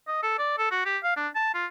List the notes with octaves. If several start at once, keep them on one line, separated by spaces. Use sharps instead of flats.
D#5
A4
D5
A4
F#4
G4
F5
D4
A5
F4